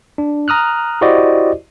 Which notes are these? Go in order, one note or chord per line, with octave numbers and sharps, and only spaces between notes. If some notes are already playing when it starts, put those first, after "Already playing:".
D4
A#5 D#6 F6 F#6
E4 F#4 G4 C5 D5 D#5